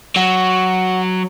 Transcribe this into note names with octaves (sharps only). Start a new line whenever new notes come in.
F#3 F#5